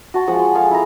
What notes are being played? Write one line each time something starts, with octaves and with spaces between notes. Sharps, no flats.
F#4 A5 C6
F3 G#3 F#5
C6
G#4 A4 F5
E4 A#5